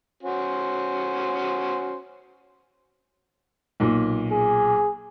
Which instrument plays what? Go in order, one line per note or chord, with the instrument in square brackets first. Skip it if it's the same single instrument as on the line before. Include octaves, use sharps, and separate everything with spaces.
[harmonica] C#4 F#4 C5
[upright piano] B1 A#2
[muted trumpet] G#4